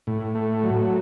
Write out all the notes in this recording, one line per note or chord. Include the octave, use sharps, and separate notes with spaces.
A2
A3
F#3